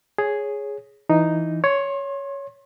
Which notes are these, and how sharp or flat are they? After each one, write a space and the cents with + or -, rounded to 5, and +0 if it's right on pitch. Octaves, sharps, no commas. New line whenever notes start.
G#4 +0 C#5 +0
E3 +0 D#4 +0
C#5 +10 C6 +35